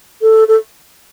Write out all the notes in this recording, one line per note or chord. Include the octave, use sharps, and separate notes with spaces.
A4
A4